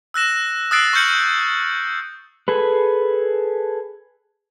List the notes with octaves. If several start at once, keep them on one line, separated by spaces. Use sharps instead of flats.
E6 F#6 A#6 E7
D#6 E6 F#6 A6 C7 D7
C#6 F6 G6 C#7 F#7
G#4 A4 B4